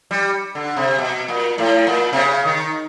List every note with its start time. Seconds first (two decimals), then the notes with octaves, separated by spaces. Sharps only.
0.11 G3
0.55 D3
0.77 C3
0.98 B2
1.28 A#2
1.58 A2
1.87 A#2
2.13 C3
2.17 C#3
2.46 D#3